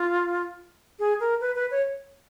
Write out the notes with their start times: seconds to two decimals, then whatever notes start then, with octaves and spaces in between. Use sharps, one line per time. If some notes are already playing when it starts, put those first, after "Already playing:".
Already playing: F4
0.99 G#4
1.20 A#4
1.41 B4
1.55 B4
1.71 C#5